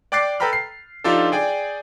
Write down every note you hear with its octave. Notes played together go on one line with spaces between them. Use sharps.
D5 G5 D6 F#6 A6 C7
A4 B4 G5 A#5 B5 F6
C7
F3 D4 D#4 F4 G4 A4
G#4 D5 G5 G#5